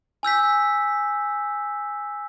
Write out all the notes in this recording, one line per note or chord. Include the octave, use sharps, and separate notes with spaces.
G#5 E6 G6 B6